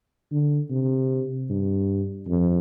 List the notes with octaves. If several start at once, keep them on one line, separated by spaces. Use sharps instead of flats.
D3
C3
G2
F2